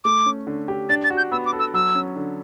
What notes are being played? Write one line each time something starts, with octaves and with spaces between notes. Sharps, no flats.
A3 D6
C#4
D3
G4
D4 A6
A6
F#4
G6
B3 E6
D6
A4
E6
F#3 E6
C#4
D3